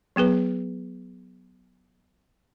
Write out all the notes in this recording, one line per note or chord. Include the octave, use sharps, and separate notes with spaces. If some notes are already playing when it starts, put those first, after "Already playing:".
F#3 B3 G#4 B4